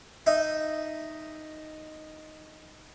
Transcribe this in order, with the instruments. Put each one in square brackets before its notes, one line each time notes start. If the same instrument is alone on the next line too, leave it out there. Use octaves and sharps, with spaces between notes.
[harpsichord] D#4 E5